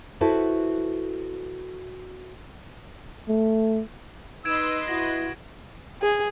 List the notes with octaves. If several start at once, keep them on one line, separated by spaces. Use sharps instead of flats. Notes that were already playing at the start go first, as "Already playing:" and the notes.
E4 F#4 A4 B4 C5
A3
D#4 B4 D#5 C6 E6 G#6 D7 E7
E4 F#4 A#6
G#4